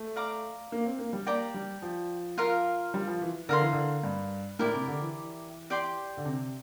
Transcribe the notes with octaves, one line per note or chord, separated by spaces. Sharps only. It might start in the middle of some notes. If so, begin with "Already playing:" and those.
Already playing: A3
D5 F5 A#5 D6
A#3
C4
A#3
G3
A#3 G4 D5 G5 A#5
G3
F3
F4 A#4 F5 A#5
G3
F3
E3
D3 A#4 F5 C6
E3
D3
G2
A2 E4 G4 A#4 D5
C3
D3
E3
G4 D5 G5 C6
D3
C3